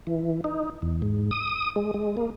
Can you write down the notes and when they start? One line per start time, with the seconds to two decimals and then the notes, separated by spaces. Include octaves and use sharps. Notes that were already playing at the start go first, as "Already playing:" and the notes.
0.07 E3
0.44 D#4
0.82 E2
1.02 G#2
1.31 D#6
1.76 G#3
1.94 G#3
2.17 A#3